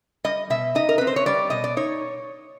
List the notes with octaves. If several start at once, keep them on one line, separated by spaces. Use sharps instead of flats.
G3 D#5
B2 E5
D#4 D#5
A#4
C4 B4
C5
C#5
G3 D5
B2 D#5
D5
D#4 C#5